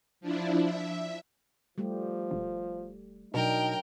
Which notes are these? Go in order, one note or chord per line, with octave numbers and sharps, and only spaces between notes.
F3 D4 E4
E5
F3 G3 A3 G4
E1
B2 F#3 D4 D#4 A#4 G5